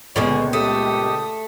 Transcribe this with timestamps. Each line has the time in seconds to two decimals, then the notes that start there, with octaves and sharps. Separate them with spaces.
0.16 C#2 A#2 D3 A#3 B3 G#4 C#5
0.53 A3 G4 D#6